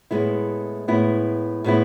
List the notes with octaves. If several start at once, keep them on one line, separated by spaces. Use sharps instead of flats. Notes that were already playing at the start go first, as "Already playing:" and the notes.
A2 G#3 B3 E4
A2 G#3 B3 E4
A2 G#3 B3 E4